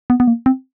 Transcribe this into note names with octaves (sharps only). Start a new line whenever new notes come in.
B3
B3
A#3
C4